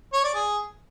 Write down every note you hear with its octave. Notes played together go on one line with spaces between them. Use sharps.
C#5
D5
G#4